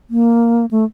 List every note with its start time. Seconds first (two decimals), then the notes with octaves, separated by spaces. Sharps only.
0.10 A#3
0.71 A3